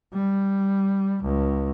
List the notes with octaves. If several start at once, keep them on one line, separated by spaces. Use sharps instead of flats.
G3
C#2